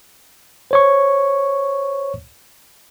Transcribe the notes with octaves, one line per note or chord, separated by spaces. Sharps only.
C5 C#5 C#6